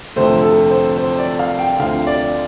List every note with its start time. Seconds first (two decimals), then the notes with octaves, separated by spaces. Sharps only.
0.16 F1 F2 D3 A3 C5
0.43 A4
0.70 C5
0.98 C5
1.18 D5
1.39 F5
1.59 G5
1.79 D2 D3 F3 C4 F5
2.07 D5